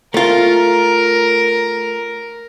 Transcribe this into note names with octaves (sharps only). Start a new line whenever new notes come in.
A3 F4 A#4